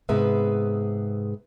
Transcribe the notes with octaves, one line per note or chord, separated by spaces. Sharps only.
G#2 C3 B3 G#4 B4 E5